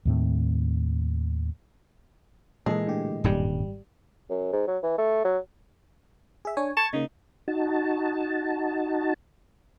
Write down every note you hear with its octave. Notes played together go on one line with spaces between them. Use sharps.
D#2 A2 C4
A#2 E3 G#3 A4
A2 D3 G4
D#1 G#1 G2 G3
F#2
G#2
F#3
E3
A3
F#3
G#4 E5
D4 C#5 G#5
A5 C#6 G#6 A6
C#3 A#3 D#4
D#4 F#4 A5